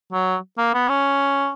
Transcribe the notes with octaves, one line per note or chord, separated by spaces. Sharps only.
F#3
A#3
B3
C#4